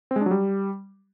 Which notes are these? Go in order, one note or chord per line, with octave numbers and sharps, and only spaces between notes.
C4
G#3
D4
F#3
G3